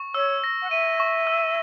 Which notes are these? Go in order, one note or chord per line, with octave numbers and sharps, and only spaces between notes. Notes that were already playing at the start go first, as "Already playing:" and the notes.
Already playing: C#6
C#5 E6
A#6
F#5
E5 D#7
C#6
E6